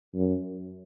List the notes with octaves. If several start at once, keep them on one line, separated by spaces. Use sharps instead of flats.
F#2